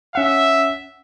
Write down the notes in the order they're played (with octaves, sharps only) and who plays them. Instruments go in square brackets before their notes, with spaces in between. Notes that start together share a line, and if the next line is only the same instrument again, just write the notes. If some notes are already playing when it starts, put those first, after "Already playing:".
[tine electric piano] C#4 F#5 [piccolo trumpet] E5